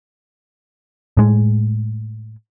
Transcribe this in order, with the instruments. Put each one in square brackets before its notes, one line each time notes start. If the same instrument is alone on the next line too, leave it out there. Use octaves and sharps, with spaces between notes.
[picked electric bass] A2 G#3